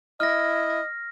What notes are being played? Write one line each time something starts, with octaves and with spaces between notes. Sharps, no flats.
E4 D#5 F6 A#6